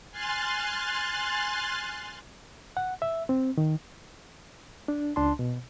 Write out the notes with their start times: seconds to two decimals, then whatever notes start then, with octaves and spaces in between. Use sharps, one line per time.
0.11 G#5 C6 F6 F#6 A6
2.77 F#5
3.02 E5
3.29 C4
3.58 D#3
4.88 D4
5.16 C#2 D4 A5 C6
5.39 B2